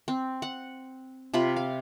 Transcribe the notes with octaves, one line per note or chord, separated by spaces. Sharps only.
C4
F#5
C3 F4 B5
F5